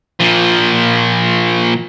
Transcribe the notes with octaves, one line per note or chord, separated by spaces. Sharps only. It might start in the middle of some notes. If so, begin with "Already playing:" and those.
A#2 F3